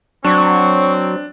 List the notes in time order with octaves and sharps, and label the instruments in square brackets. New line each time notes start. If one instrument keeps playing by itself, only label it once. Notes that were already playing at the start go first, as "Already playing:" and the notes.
[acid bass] F#3 [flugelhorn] C4 [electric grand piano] D4 [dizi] C#6